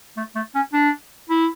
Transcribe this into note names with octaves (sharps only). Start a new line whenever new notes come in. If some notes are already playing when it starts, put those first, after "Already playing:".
A3
A3
C#4
D4
E4